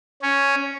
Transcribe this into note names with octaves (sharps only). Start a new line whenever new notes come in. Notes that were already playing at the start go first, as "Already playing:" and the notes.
C#4